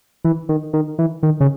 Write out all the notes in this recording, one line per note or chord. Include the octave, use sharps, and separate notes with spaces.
E3
D#3
D#3
E3
D#3
C#3